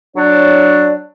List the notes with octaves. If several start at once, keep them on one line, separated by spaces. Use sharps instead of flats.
F#3 D4 C#5 D5